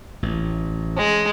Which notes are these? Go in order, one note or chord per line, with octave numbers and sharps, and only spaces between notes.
A1 E3
G#3